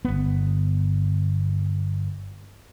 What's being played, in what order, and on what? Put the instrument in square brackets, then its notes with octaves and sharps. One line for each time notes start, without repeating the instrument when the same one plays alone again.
[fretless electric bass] G1 B3